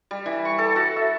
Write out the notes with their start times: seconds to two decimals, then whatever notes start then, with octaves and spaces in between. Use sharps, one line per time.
0.11 G3
0.26 E3
0.45 C#6
0.58 A4
0.76 F#4
0.96 E5